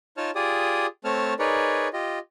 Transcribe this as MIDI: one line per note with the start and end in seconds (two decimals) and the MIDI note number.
0.17 0.31 63
0.17 0.31 65
0.17 0.31 73
0.17 0.31 81
0.17 0.31 89
0.35 0.86 65
0.35 0.86 67
0.35 0.86 68
0.35 0.86 74
0.35 0.86 87
1.05 1.34 57
1.05 1.34 60
1.05 1.34 73
1.05 1.34 81
1.05 1.34 89
1.39 1.88 63
1.39 1.88 68
1.39 1.88 70
1.39 1.88 71
1.39 1.88 73
1.39 1.88 74
1.93 2.19 65
1.93 2.19 67
1.93 2.19 75